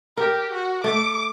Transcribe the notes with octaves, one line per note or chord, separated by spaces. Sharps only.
G4 A#4
F#4
A3 D6